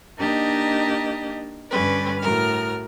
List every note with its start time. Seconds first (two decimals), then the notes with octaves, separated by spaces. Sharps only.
0.18 A#3 D4 D#4 G4 D#5
1.71 G2 D3 G3 C#4 B4 D5
2.21 A2 F#4 A#4 F6